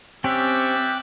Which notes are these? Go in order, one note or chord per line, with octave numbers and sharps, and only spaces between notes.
G3 C4 C#4 G4 E5 G5 D6 F#6